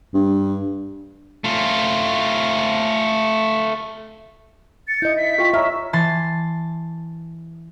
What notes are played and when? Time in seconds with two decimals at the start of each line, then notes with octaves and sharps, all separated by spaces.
0.14 G2
1.44 A3 F4
4.88 A6 C#7
5.02 E4 D#5 G6
5.17 E5 B6
5.38 F4 G5 C#6
5.54 C#5 E5 A#5 F6
5.93 E3 A5 C6 A6